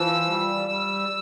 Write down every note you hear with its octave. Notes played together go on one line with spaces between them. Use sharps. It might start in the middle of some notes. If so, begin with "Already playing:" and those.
Already playing: E3 F3 E6
G3
G3 E6